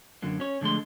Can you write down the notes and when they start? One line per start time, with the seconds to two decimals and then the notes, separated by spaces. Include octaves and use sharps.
0.22 F#2 D3 F#3 A#3
0.40 C#4 C#5
0.61 D3 F3 G#3 A3 C6